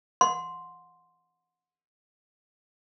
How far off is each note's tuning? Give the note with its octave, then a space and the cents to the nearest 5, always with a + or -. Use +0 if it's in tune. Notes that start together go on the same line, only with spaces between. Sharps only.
F#5 -30 C6 +0